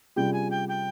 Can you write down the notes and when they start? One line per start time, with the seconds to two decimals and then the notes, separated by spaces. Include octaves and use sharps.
0.16 C3 G3 C#4 F4 G#4 G5
0.33 G#5
0.51 G5
0.69 G5